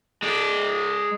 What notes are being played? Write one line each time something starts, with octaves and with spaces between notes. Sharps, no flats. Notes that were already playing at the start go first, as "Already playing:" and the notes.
G#3 D5